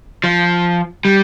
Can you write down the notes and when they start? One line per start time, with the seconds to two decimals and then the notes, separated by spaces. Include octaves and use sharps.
0.24 F3
1.05 G3